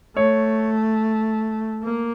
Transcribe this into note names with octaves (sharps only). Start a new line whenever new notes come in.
A3 C#5
A#3